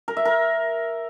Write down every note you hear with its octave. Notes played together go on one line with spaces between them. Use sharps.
A#4
E5
A#4